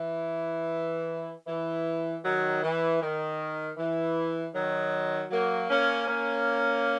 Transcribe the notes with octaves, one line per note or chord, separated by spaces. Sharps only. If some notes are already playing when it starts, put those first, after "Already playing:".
Already playing: E3
E3
D#3 F#3
E3
D#3
E3
D#3 F#3
F#3 A#3
A#3 C#4
A#3 C#4